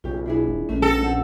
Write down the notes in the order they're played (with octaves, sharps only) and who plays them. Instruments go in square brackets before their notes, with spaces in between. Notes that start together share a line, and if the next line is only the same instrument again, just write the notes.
[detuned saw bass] B1 [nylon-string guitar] C#3 G4 [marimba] F4
[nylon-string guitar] D4 E4 G#4
[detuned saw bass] D#1
[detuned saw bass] A#1 [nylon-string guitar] D#3 G#3 A3 [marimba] C#4
[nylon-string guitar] G#3 B3 G5 [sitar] A4 [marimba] A#6
[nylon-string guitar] C4 [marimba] F#5 A5